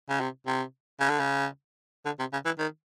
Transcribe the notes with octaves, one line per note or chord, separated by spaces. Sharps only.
C#3
C3
C3
C#3
D3
C#3
D3
C3
C#3
E3
D#3